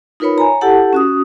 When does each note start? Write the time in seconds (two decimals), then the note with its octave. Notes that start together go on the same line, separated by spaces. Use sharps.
0.20 D#4 F4 A#4 B4 C#5 B5
0.38 C#5 G#5 A#5
0.61 E4 G4 A4 F#5 A5
0.93 C#4 F#4 D#6